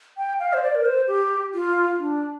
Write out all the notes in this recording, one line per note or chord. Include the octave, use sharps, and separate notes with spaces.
G5
F5
C5
D5
A#4
C5
G4
F4
D4